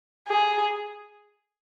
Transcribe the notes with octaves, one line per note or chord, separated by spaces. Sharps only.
G#4